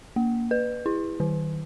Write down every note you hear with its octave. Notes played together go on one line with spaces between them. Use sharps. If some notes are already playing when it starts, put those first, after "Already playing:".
A#3
B4
E4
D#3